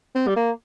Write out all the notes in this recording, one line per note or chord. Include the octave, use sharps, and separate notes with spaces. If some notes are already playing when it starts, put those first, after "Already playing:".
C4
G3
A#3